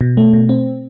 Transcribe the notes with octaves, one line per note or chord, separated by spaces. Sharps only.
B2
A3
B2
C4